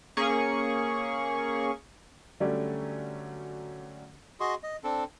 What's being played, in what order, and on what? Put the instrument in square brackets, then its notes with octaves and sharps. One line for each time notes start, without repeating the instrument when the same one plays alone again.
[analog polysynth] A#3 C#4 G#4 C#6
[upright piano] D3 F#3 G3 A3 C#4 D5
[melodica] F#4 G#4 D#5 C6
D#5
C4 D4 A4